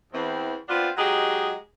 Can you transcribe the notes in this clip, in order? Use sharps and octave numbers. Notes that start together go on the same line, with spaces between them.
E2 E3 C4
B3 C4 D4 F4
F#3 G#3 D#4 G4 G#4